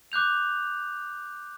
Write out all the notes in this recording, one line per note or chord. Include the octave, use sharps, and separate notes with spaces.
D6 F#6 G6 F7